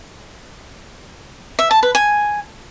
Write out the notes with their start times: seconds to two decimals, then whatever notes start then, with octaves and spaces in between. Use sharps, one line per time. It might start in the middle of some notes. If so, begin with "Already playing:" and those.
1.59 E5
1.71 A5
1.83 B4
1.95 G#5